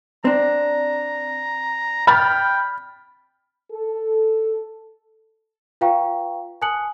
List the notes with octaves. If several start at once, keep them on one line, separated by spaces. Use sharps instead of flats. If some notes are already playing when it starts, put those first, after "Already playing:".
C4 D4 A#5
G5 B5 F6 A6
A4
F4 B4 F5 G5 A#5 C#6
G#5 A5 D#6 F#6 C#7 F#7